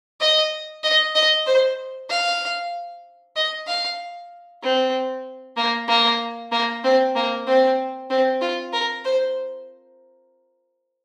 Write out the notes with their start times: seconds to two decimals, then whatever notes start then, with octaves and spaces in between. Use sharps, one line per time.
0.21 D#5
0.84 D#5
1.15 D#5
1.47 C5
2.10 F5
3.36 D#5
3.67 F5
4.63 C4
5.57 A#3
5.88 A#3
6.52 A#3
6.84 C4
7.16 A#3
7.47 C4
8.10 C4
8.41 F4
8.73 A#4
9.05 C5